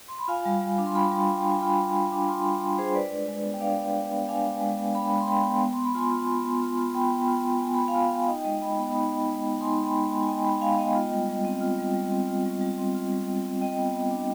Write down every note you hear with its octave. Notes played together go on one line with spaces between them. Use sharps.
C6
B5
F4 F5 G#5
G3
G3
D4
C6
F4 G5 B5
G3
G3
G5
D4
G#5
F4 G5 B5
G3
G3
D4
F4 G#5 C6
G3 G5 B5
G3
D4 G#4 C5
D4 B4 D5
G#3
G#3
B3
G5
D4 D5 F5
G#3
G#3
B3
D4 F5 G#5
G#3
G#3
B3
D4 G5 B5
G#3
C6
G#3 G5 B5
B3
B3
C6
B3
B5
F4 G#5 C6
F4
B3
B3
F4
F4
B3 G5 B5
B3
F4
F4
B3 G#5
B3 B5
F5 G#5
F4
F4
D#4 D#5 G5
G#3 D#5 G5
G#3 G5 B5
B3 G5 B5
D#4
G#3
G#3
B3
D#4 G#5 C6
G#3
G5 B5
G#3
B3
G#5
D#4 D#5 G5
G#3 G5 B5
G#3 F5 G#5
B3 D#5 G5
F4
G3
G3
C4
F4
G3
G3
C4
F4
G3
G3
C4
F4
G3
G3
C4
F4 D#5 G5
B3
B3
D4